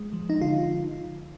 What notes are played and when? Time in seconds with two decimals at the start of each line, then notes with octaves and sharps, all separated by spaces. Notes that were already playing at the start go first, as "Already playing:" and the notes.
Already playing: G#3
0.13 F3
0.30 D#4
0.41 D3 F4